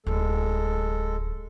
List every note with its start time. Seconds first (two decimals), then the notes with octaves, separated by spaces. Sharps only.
0.07 D1 G#3 F4 A4